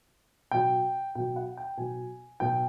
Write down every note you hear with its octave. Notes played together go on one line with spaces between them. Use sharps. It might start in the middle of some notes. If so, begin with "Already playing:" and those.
B2 F#3 G5
B2 F#3 G5
F#5
G5
B2 F#3 G#5
B2 F#3 G5